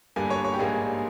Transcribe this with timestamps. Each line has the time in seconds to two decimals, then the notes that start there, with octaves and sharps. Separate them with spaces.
0.16 G1 G2 G3 A#3 G#5
0.30 C#5
0.44 C#5
0.54 G4
0.59 A#1 G#2 G3 A#3 G#4